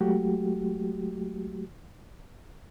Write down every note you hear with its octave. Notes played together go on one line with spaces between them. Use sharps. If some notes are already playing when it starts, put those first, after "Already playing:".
F#3 G#3 A3 F#4 G4